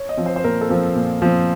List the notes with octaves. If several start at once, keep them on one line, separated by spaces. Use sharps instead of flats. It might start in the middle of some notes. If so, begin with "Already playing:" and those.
Already playing: C#5
D#5
F3 C4
C5
C5
A#2 A#4
A4
F3 C4
A#2
F3 C4